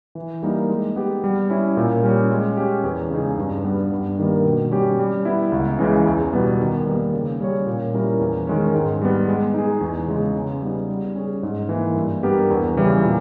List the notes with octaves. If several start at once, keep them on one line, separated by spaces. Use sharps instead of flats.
E3
G3 A#3 D#4
G#3
B3 G4
G3
C#4 E4
A#2
G3 C#4
G#3
C#4 G4
E2
C#3 G#3 D#4 G#4
G2
G3 B3
G2
D#3 G3 A#3
B2
G3 C#4 G4
G3
B3 E4
C#2
C#3 E3 G#3
E2
B2 G3 B3
D#3
G3 A#3
C#3
G3 C#4 G#4 C#5
A#2
G3 C#4 E4 A#4
E2
D#3 G#3 C#4
G#2
G3 B3
G#3
D#4 G#4
E2
C#3 G#3
C#3
G3 B3 D#4
G3
C#4 G#4
G#2
E3 A#3
G2
G3 B3 G4 A#4
E2
C#3 E3 G3
A#2